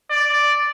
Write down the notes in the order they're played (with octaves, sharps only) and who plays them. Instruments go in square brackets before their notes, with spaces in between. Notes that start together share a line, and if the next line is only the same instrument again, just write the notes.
[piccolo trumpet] D5